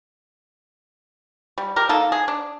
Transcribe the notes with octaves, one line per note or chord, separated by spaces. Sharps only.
G3
G4 A#4
A#3 D#4 A4
G#4
D4